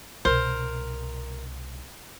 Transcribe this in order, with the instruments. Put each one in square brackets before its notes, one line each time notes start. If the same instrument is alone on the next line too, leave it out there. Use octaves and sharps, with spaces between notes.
[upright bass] C2 B2 [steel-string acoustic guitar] A#4 [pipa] C5